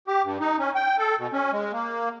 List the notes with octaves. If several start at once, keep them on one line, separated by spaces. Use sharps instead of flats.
G4
G2
D#4
C#4
G5
A4
B2
C#4
G#3
A#3